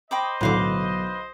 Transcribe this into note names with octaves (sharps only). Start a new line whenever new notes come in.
C5 D#5 G5 B5 D6
B1 A2 D3 B4 F5 D6